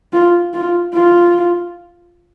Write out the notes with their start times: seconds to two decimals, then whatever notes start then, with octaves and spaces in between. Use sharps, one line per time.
0.13 F4
0.53 F4
0.93 F4